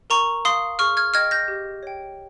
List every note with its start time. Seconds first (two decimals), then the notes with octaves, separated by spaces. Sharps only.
0.10 A#4 A#5 C#6
0.45 F5 C6 D#6
0.79 G#4 C#6 F6
0.97 F6 G#6
1.14 D#5 G5 F6 G#6
1.31 G6 A#6
1.48 G4
1.83 C#5 G5